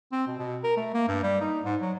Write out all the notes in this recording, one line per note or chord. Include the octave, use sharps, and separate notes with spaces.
C4
B2
B2
A#4
A3
A#3
G2
G3
D#4
G#2
F#3